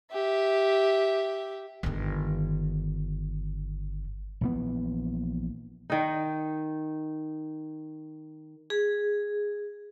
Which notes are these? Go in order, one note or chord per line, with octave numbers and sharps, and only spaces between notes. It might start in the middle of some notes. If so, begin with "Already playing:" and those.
G4 E5
G1 D#3
A#1 E3 B3
D#3 D#4
G#4